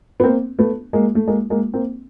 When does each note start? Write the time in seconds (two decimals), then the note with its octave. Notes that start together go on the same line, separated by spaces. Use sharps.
0.20 B3
0.24 A#3 C4
0.59 A3 B3
0.93 G#3 A#3
1.15 A3
1.27 G#3 A#3
1.50 G#3 A#3
1.74 A#3 C4